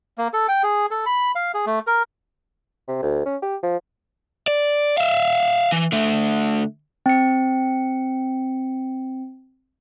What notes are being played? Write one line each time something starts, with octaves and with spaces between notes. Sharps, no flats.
A#3
A4
G5
G#4
A4
B5
F5
G#4
A3
A#4
C3
D2
C#4
G4
F3
D5
E5 F5
E3
D3 A3
C4 C#7